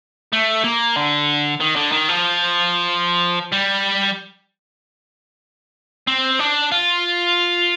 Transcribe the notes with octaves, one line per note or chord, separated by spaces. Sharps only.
A3
A#3
D3
D#3
D3
D#3
F3
G3
C4
D4
F4